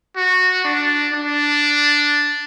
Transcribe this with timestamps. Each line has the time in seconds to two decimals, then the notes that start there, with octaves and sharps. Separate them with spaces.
0.16 F#4
0.64 D4
1.13 D4